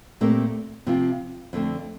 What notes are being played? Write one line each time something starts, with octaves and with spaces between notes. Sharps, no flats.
A#2 A3 C4 G4 A#4
C3 F3 C4 F4
F2 D3 A3 C4